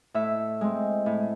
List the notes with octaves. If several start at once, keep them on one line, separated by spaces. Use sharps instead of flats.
A2 E5
G#3 C4
A2